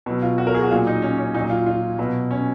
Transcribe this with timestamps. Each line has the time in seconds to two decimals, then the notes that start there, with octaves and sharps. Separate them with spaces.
0.06 B2 F#3
0.22 F4
0.38 F#4
0.47 A#4
0.54 G#4
0.62 F#4
0.71 A#2 F#3 F4
0.87 D#4
1.02 C#4
1.18 C#4
1.34 A#2 D#4
1.39 F#3
1.50 F4
1.66 F4
1.98 B2 F#3
2.31 C#4